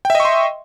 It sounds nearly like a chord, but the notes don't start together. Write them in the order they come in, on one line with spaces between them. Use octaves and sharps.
G5 E5 D#5 C#6 C6